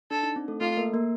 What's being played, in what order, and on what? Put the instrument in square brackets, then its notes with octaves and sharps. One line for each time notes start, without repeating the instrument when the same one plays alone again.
[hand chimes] D4 [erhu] A4
[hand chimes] D#4
C4
A3 A4
[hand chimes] A3 A4 [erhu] F4
[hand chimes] A#3 A#4
A#3 A#4